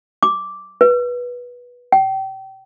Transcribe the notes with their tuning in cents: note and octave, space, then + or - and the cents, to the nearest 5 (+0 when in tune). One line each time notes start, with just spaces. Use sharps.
D6 -5
B4 -15
G5 -30